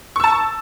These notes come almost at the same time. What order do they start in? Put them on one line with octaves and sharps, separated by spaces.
C#6 E6 A5